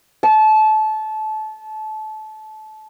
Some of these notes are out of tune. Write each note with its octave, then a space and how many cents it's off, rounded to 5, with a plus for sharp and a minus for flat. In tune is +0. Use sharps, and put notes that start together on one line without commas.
A5 -25